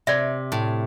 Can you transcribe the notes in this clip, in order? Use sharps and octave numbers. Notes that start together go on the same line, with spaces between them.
C3 D5 E5
A2